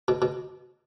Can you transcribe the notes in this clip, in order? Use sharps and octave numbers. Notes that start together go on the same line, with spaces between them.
B2
B2